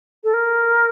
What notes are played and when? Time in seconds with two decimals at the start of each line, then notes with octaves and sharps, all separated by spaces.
0.23 A4
0.33 A#4